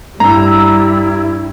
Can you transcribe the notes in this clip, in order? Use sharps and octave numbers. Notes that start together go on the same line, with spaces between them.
G2 G3 E4 A#5 E6